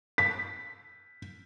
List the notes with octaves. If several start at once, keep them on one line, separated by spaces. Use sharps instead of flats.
B6